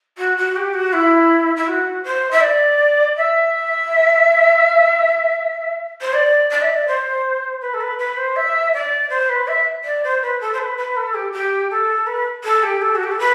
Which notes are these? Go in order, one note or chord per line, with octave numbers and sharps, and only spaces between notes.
F#4
F#4
G4
F#4
E4
E4
F#4
C5
E5
D5
E5
C5
D5
D5
E5
D5
C5
B4
A4
B4
B4
C5
E5
D5
C5
B4
E5
D5
C5
B4
A4
C5
B4
B4
A4
G4
G4
A4
B4
A4
G4
A4
F#4
G4
A4
B4